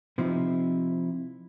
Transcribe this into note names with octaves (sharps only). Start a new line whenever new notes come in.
C3 F3 C4 D#4 E4